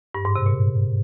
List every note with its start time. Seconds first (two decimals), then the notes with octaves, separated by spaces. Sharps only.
0.14 G2
0.25 G#2
0.36 C3
0.46 A#2